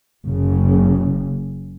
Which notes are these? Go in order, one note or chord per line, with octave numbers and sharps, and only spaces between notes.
F#1 C#3